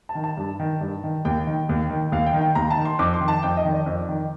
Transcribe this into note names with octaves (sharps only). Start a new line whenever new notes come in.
A5
D#3
A5
G2
D#3
G2
D#3
D#2 G5
D#3
D#2
D#3
D#2 F5
G5
D#3
G5
D#2 A#5
A5
D#3
C6
F2 D6
C6
D#3
A5
F2 G5
D#5
D#3
D5
F2
D#3